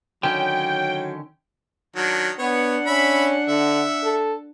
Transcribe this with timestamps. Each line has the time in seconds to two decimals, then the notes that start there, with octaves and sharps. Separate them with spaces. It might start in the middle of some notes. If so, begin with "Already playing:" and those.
0.23 D3 D#3 F#3 C#4 G5
1.96 D#3 F#3 D4
2.39 B3 D4 C#5 F#5
2.87 C#4 E5 B5
3.48 D3 E5
4.04 A4